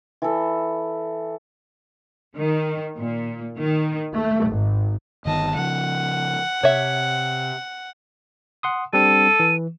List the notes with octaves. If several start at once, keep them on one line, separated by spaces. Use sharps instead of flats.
E3 A4
D#3
A#2
D#3
A3
G#1
G1 D#3 B3 D#5 A5
C#3 F3 F#5
C3 C#5 E5
F#5 C6 D#6
G3 C4 D4 A4 D#7
E3